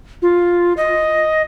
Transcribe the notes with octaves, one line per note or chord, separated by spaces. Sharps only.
F4
D#5